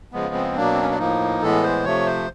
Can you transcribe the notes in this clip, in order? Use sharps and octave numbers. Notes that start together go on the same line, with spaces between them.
C#3 F3 G#3 B3
C4
B2 F#3 A#3 D4
C4
C#4
D4
A2 F3 A#3 D#4
A2 E3 G#3 B3 A4
C5
C3 F3 A3 C#5
C5